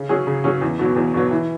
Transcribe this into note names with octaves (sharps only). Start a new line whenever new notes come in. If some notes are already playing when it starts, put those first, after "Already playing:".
Already playing: C#3
F#3 C#4 G#4
C#3
F#3 C#4 G#4
E2
B2 F#3
E2
B2 F#3
E3